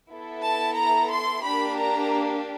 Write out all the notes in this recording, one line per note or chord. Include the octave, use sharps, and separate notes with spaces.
B3 E4 A4
A5
A#5
C6
A#3 D4 G4 B5
A#5